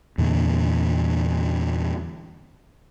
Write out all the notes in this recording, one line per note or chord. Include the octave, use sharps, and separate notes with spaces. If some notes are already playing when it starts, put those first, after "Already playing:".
E2 A#2 D3